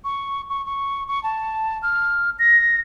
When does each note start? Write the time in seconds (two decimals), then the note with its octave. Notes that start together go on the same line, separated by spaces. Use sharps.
0.04 C#6
0.49 C#6
0.66 C#6
1.08 C#6
1.23 A5
1.83 F6
2.39 A#6